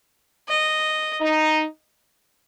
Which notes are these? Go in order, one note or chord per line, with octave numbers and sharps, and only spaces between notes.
D#5
D#4